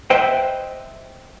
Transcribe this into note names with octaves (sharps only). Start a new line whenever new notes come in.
B4 C5 D#5 E5 G5